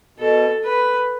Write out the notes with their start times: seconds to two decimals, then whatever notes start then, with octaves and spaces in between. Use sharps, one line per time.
0.18 B2 A4
0.64 B4